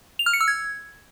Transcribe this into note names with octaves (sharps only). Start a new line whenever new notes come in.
F7
F6
C#7
E6
G#6